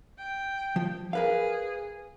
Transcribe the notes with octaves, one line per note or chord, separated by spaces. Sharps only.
G5
F3
G#4 A#4 B4 F5